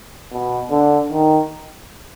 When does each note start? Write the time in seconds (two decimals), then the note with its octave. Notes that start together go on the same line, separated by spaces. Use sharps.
0.32 B2
0.71 D3
1.10 D#3